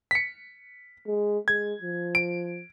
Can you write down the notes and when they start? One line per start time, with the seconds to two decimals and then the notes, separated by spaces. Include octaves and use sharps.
0.11 B6 C#7
1.07 G#3
1.48 G#3 G#6
1.81 F3
2.15 D7